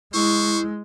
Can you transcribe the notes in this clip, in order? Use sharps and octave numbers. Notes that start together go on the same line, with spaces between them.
G#3 E4 C5 C#6